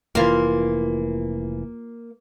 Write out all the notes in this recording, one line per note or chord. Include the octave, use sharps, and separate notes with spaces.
F1 E3 A#3 F4 A#5 C6